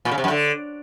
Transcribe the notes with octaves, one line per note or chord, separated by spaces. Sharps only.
A#2
C#3
C3
F#2
D3